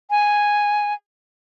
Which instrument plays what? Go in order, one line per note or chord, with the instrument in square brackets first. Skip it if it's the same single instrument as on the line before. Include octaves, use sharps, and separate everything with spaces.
[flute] G#5